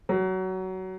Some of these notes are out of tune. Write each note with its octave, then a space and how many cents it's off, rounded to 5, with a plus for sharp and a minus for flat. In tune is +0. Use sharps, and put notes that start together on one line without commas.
F#3 +20